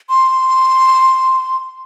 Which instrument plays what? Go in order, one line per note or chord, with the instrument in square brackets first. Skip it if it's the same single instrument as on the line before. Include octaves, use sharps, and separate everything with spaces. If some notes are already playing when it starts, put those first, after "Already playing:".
[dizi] C6